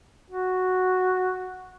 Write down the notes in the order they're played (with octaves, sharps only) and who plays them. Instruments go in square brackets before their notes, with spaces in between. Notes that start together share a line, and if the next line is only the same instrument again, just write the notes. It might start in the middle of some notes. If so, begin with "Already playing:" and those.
[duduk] F#4